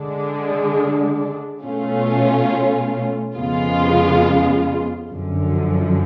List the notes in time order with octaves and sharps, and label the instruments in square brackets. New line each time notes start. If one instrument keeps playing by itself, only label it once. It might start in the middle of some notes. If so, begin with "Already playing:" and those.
Already playing: [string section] D3 G#3 D4
B2 A3 C#4 F4
F2 C#3 G#3 B3 F4
F#2 D3 F3